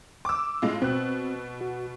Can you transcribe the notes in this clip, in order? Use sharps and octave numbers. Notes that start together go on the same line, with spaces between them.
D6 E6
A2 G#3 F4
B2 C4 F#6
F#4